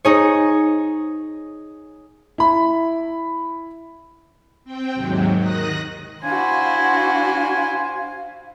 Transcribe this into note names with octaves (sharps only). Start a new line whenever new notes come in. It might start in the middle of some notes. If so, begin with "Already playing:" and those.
D#4 G#4 C#5
E4 B5
C4 G5
D#2 G#2 C3 F#3
D#3 D#6 F#6 A#6
D4 E4 F#4 C5 F5 G#5